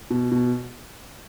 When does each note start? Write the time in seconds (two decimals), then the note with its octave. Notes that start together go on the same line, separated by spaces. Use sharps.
0.10 B2
0.31 B2